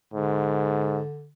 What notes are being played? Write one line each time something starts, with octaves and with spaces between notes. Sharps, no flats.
G#2 D3